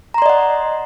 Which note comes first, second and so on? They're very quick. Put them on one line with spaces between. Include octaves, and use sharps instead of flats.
A#5 C6 D5 D#5 F#5